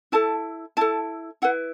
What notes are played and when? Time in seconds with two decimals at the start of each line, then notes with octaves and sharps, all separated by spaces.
0.12 E4 A4 A5
0.77 E4 A4 A5
1.42 E4 B4 F#5